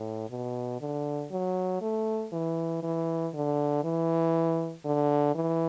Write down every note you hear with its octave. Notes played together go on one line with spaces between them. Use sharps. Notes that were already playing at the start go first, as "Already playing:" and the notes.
Already playing: A2
B2
D3
F#3
A3
E3
E3
D3
E3
D3
E3